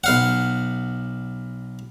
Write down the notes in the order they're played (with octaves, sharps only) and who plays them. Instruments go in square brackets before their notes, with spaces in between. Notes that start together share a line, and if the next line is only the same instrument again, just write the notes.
[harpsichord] B1 F5 F#5